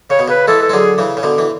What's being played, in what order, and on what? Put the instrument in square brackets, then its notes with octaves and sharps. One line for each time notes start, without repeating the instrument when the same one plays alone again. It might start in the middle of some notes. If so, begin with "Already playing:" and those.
[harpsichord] C#3 [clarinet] C#5
[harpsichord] B2
[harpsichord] C#3 [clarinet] B4
[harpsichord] E3 G#3 [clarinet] A4
[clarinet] A4
[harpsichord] G#3
[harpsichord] D3 F#3 [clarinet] G#4
[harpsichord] C#3 E3
C#3
B2 D3
E3